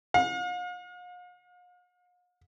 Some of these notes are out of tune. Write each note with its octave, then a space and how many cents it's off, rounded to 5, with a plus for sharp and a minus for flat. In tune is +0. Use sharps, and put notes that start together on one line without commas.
F5 +45